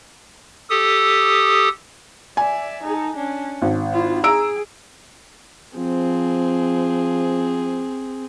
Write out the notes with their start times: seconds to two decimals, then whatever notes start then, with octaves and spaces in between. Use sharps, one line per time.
0.70 G4 A4 D#6
2.37 D5 E5 G#5
2.83 D#4 A4
3.15 C#4 D4
3.62 G#1
3.92 E4 F4
4.24 G#4 A#5 E6 D7
5.77 F3 C4 G#4